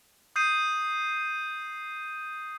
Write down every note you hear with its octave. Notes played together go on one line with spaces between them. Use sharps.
D#6 G6 C7 D#7